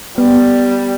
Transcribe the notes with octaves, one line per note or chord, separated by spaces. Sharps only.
G3 B3